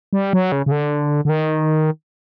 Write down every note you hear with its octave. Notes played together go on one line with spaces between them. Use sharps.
G3
F#3
C#3
C#3
D3
D3
D#3